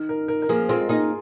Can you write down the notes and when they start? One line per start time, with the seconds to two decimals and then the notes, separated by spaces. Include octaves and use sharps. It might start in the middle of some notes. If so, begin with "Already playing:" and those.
Already playing: D#3
0.09 A#4
0.28 A#4
0.42 A#4
0.49 F3 A#3 G#4
0.69 G#3 C4 F4
0.89 A#3 D#4 G#4